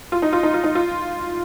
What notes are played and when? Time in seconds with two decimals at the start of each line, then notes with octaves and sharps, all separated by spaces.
0.12 F4
0.22 D#4
0.33 F4
0.43 D#4
0.54 F4
0.64 D#4
0.75 F4